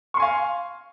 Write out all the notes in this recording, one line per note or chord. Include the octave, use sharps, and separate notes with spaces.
F5 G#5 C6 C#6